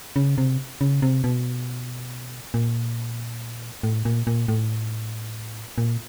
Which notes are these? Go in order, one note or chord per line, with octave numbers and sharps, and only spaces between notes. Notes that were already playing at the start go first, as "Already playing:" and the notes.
C#3
C3
C#3
C3
B2
A#2
A2
A#2
A#2
A2
A#2